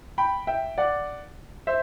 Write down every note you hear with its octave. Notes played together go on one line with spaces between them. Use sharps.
G5 B5
E5 G5
D5 F#5
C5 E5